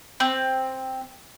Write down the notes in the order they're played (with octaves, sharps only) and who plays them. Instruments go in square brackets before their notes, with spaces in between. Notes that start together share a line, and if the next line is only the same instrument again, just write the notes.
[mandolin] C4